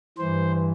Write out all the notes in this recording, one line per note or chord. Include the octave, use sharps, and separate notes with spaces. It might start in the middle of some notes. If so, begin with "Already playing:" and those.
G2 E3 C5